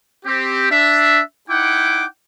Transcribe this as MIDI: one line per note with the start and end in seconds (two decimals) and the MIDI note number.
0.25 0.67 60
0.25 0.67 67
0.70 1.20 62
0.70 1.20 76
1.49 2.05 63
1.49 2.05 64
1.49 2.05 78
1.49 2.05 79
1.49 2.05 86